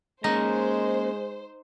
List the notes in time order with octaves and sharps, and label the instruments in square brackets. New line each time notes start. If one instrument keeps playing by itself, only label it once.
[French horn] G#3 [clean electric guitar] A#3 C#4 A#5 [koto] D#4 [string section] C5